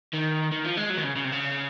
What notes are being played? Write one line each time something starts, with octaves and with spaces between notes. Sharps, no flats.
D#3
D#3
F3
G#3
F#3
D#3
C#3
C#3
C3
C#3